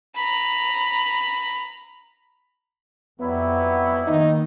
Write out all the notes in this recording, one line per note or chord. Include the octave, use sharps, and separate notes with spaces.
A#5 B5
F2 F#3 G3 B3 E4
D#3 A#3 D#4